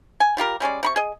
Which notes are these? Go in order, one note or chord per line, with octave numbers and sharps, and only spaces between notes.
G#5
G3 F4 G4 A#4
G3 G#3 C#4 D5
C3 B5 C#6
G#4 D#5